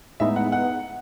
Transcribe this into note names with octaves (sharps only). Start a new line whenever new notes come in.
A2 G#3 B3 D#4 E5
F#5
F#5